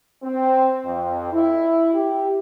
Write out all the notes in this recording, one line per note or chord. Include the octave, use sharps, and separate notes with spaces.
C4
F2
E4
G4